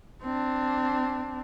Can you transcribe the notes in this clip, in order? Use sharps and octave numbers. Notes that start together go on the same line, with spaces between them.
C4 D4